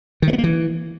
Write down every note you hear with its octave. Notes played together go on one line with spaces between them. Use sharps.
D#3
A3
B3
A#3
E3